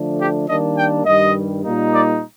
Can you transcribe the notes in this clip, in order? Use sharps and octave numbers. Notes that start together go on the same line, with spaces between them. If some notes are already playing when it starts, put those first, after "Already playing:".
Already playing: D3 F3 A3 D4
G4
D#3 G3 A#3 D4 D#5
G5
G2 D#3 G3 D#5
A#2 G3 A#3 D#4
D5